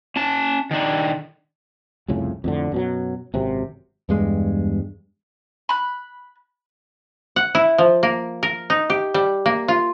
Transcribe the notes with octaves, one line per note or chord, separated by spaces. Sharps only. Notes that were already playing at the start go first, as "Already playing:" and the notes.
C#4 A5
D#3 D4
C2 F2 A2 C#3
F2 A2 D3
F#2 B2 F#3
G#1 F#2 C3
E2 G2 G#3
B5 F#6
F#5
E4
F3
A#3
A#4
D#4
G4
G3
A#3
F4